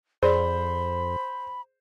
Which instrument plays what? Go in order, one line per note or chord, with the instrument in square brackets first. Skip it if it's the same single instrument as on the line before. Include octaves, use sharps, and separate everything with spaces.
[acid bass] F2 [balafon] G#4 D5 [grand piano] C5 [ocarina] B5